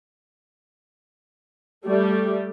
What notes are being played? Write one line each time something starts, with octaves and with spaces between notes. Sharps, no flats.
G3 A3